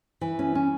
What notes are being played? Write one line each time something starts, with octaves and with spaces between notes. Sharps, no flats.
E3
C#4
C#4